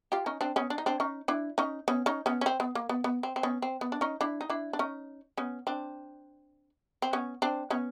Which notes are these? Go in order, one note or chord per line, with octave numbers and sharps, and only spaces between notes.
F4 G4
C#4 D#4
C4 D4
B3 C#4
D4
D#4
C4 D4
C#4 D#4
D4 E4
C#4 D#4
B3 C#4
C#4 D#4
B3 C#4
C#4
C4
B3
A#3
B3
B3
C4
C4
B3 C#4
C4
B3
D4
C#4 D#4
D4 E4
D#4
D4 E4
D4
C#4 D#4
B3 C#4
C4 D4
C4
B3 C#4
C4 D4
B3 C#4